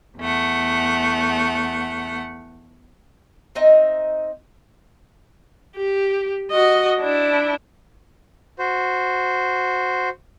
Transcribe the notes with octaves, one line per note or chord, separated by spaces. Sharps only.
E2 A3 F#5
C4 D#4 D#5 E5
G4
F#4 D#5
D4 E4
F#4 C5